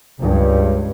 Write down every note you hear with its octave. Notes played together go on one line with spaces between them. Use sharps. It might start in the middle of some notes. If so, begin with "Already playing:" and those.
C#2 G2